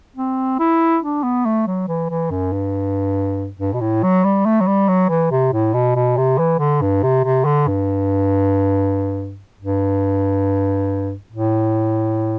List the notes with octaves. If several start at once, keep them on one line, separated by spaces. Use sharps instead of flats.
C4
E4
D4
B3
A3
F#3
E3
E3
F#2
G2
G2
B2
A2
F#3
G3
A3
F#3
G3
F#3
E3
C3
A2
B2
B2
C3
E3
D3
G2
C3
C3
D3
G2
G2
A2